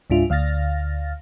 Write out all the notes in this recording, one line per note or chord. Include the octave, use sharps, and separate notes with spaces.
C#2 G#2 D4 F4 E5
D2 F5 F6 A6 A#6